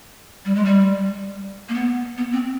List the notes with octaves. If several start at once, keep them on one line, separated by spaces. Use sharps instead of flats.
G3
G#3
G3
A#3
B3
B3
C4